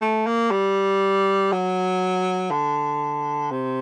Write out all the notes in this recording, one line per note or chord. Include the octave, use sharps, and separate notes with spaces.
A3
A#3
G3
F#3
D3
C3